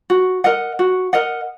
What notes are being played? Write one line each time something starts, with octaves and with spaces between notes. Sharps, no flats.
F#4
A#4 D#5 F#5
F#4
A#4 D#5 F#5